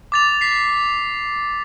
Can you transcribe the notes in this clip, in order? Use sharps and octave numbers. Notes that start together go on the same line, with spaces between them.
D6 A6 F7
B6 C7